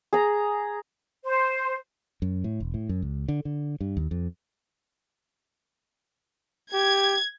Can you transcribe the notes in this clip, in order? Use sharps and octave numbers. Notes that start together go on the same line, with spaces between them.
G#4 A#5
C5
F#2
A2
E1
A2
F#2
C#2
D3
D3
G2
D#2
F2
G4 G#6